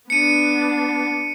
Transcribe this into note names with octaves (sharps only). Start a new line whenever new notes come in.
B3 D4 C#7 D#7